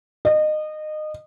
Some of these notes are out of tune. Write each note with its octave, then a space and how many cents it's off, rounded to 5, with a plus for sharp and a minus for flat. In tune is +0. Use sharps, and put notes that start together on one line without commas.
D#5 -25